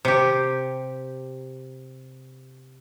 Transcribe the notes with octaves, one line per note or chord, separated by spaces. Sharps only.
C3 G4